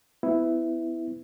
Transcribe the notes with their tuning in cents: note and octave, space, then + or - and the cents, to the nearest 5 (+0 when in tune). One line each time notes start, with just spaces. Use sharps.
B3 +25 E4 +0